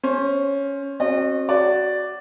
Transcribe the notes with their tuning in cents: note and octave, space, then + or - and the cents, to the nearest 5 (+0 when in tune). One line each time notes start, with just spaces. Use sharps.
C#4 +0 C5 +20
C4 +40 F#4 +5 D#5 -35
F#4 +10 D5 +0